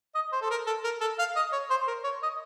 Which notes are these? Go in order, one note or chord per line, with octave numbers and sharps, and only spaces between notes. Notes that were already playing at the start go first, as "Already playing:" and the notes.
D#5
C5
A4
A#4
A4
A#4
A4
F5
D#5
C#5
C5
A#4
C#5
D#5